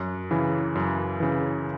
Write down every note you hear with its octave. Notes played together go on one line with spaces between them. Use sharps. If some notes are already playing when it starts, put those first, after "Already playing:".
Already playing: F#2
C#3 E3
F#2
C#3 E3